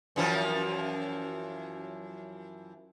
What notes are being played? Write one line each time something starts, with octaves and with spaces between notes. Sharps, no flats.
F#2 E3 F3